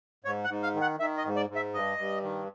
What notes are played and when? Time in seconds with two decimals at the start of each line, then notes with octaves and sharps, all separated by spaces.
0.24 G#2 C#5
0.44 F#5
0.50 G#2
0.63 F5
0.75 D#3
0.81 F#5
1.00 D#3 E5
1.18 D#5
1.25 G#2
1.36 D5
1.50 G#2
1.56 E5
1.74 G2 D#5
1.98 G2
2.23 D#3